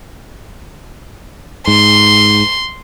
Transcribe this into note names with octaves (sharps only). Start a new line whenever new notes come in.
G#2 C6